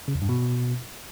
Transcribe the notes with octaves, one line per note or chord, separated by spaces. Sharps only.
C#3
E2
G2
B2